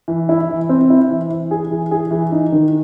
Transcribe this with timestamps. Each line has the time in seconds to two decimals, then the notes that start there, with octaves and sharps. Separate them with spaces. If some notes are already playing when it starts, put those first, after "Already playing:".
0.08 E3
0.29 E4
0.49 E3
0.69 C4
0.90 E4
1.10 E3
1.30 E3
1.51 G#4
1.71 E3
1.91 G#4
2.11 E3
2.32 D#4
2.52 D#3